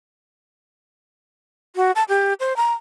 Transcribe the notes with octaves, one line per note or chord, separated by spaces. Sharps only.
F#4
A5
G4
C5
A#5